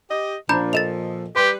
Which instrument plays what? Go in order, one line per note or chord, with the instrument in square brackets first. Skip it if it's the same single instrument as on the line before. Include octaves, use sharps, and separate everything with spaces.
[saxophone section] G4 D#5
[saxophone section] A#2 F3 [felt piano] D4 C5 [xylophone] A#5 B5 G6
[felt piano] A4 D#5 [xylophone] A6 E7 F7
[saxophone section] G3 B4 [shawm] G4 [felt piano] C6